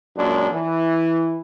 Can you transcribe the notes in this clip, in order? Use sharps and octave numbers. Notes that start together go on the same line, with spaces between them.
F#2 A#2 G#3 D4
E3